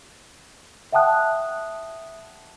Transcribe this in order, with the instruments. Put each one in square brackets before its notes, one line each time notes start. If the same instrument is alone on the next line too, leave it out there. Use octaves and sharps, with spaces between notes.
[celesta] E5 F#5 G5 A5 D#6 F#6